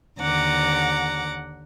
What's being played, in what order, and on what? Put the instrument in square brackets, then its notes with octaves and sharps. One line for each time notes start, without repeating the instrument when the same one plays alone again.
[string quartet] D#2 D3 F#5 A#5 D6